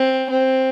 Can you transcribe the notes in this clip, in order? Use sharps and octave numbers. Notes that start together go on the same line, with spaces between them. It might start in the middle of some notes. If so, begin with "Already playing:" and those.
Already playing: C4
C4